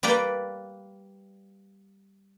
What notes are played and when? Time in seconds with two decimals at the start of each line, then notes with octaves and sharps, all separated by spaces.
0.03 G3 A#3 B4 D5 G5